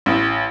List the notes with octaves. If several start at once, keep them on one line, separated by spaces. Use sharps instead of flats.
A1